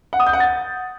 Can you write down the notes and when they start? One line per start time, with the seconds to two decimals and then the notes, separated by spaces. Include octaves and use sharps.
0.13 F#5
0.20 D#6
0.27 G6
0.33 F#5
0.40 A6